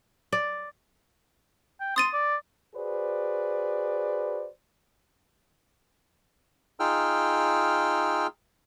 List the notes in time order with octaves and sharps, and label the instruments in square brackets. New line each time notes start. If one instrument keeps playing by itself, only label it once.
[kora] D5
[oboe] G5
[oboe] C6 [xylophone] D#6 A6 D#7
[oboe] D5
[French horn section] F#4 G#4 B4 C5 D5
[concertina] D#4 F4 G#4 G5 E6 F6